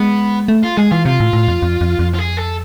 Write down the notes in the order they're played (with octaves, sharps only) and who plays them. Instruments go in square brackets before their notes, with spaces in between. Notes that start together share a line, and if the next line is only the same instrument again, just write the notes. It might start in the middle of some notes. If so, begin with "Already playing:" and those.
Already playing: [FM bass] G#3 [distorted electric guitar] B3
[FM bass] A3
[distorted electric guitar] F4
[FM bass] G#3 [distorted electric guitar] G#4
[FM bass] E3 [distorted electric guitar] F4
[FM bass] C3 [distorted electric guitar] F4
[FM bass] A2
A2
F2
F2
F2
F2
[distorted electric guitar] F4
G#4
A4